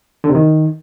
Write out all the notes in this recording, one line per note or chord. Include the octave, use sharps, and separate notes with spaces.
D3
C3
D#3